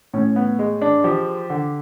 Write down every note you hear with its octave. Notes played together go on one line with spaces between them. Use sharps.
A2 C#4
B3
G#3
D4
F3 G4
D3